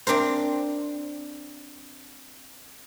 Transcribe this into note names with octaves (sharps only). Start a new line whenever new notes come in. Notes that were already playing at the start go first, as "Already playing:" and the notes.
C4 D4 A#4 C5